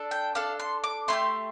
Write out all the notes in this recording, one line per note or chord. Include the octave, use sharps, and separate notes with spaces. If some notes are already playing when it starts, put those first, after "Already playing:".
Already playing: D4 A4
G5
D4 A4 F5
C6
D6
A3 E4 G4 C6